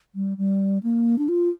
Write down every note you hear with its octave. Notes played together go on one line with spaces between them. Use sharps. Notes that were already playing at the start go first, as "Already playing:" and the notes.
G3
G3
A#3
D4
F4